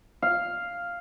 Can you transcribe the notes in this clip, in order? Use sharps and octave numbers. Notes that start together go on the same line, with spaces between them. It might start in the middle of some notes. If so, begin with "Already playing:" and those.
F5